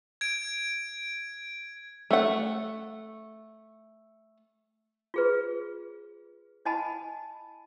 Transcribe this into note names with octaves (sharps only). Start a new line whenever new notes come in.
G#6 D7
A3 F#5
F4 G#4 B4
E4 D#5 F#5 G#5 A5 B5